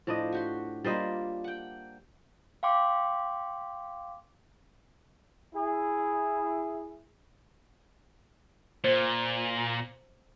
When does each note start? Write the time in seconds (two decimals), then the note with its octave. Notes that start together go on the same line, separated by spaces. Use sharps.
0.07 A2 F3 D4 D#5
0.32 F#4 G4 C6
0.84 G3 A#3 D4 F4 C5 D#5
1.44 F#5 G5
2.63 F5 G5 C6 D6
5.54 E4 G#4
8.84 A#2 C5